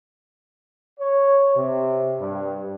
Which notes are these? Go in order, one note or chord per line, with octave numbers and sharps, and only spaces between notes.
C#5
C3
G2